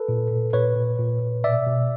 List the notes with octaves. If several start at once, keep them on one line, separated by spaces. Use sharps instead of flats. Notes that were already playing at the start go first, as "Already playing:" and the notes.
Already playing: A4 B4
A#2
A#2
A#2 B4 C#5
A#2
A#2
A#2
B2 D5 E5
B2